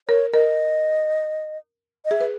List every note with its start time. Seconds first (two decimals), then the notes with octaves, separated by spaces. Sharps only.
0.08 A#4 C#5
0.33 A#4 D#5
2.05 D#5
2.11 G#4 E5
2.21 B4